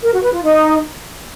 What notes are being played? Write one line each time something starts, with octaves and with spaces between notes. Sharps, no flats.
A#4
F#4
B4
F4
D#4